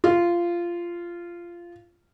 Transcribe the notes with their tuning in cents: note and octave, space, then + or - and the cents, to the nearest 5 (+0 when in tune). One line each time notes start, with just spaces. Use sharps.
F4 -15